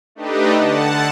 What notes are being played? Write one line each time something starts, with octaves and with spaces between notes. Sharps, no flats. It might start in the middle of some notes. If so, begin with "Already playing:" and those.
A3 D4 D#4 G4 B4 D#5
D3 F#5 A5